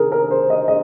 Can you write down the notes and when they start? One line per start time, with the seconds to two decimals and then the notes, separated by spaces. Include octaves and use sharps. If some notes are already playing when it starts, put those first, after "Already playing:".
Already playing: C3 D#3 G#4 A#4
0.12 A#4
0.31 C5
0.50 D#5
0.68 D#5